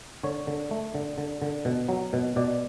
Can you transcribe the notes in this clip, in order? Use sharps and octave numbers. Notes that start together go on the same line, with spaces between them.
D3 C#5
D3
A3
D3
D3
D3
B2
F#3
B2
B2 D5